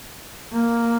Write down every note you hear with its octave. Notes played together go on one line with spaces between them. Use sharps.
A#3